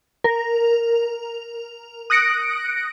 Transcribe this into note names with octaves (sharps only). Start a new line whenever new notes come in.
A#4
D#6 F#6 A#6 C#7 D7